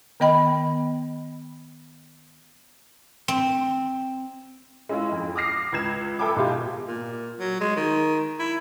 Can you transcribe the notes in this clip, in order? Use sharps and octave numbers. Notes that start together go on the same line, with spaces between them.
D#3 B3 D#5 G5 B5
C4
G#3 C#4 E4 F4
F2
D6 D#6 F6 A#6 C7
C#2 B4 G#6 E7
A4 E5 G5 G#5 B5 D6
G#2 B2 G#3 F4 G4
A#2
F#3
G#3
D#3
E4